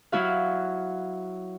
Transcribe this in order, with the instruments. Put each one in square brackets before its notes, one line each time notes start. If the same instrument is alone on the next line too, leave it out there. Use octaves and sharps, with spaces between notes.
[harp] F#3 E4 F#4 F5